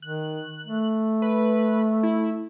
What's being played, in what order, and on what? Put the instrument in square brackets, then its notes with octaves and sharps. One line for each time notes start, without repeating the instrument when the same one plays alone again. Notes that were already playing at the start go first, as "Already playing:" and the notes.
[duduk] D#3 [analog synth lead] F#6
[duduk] A3
[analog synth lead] B4
E4